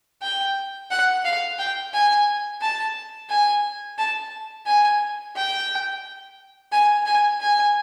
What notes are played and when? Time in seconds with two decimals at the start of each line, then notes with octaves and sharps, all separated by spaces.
0.22 G5
0.91 F#5
1.25 F5
1.59 G5
1.93 G#5
2.61 A5
3.30 G#5
3.98 A5
4.66 G#5
5.36 G5
6.72 G#5
7.06 G#5
7.41 G#5